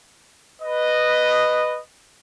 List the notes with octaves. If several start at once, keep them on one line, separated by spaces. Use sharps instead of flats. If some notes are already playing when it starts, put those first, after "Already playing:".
B4 D#5